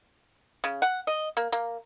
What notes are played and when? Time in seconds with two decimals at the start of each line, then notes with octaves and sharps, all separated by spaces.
0.64 C#3
0.82 F#5
1.07 D#5
1.37 A#3
1.52 A#3